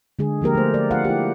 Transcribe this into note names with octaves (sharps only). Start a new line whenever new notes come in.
D3 G#3 G#4
F3 A#3 G4 A#4
A3 C5
D5
F4 F5 F#5
E4 G4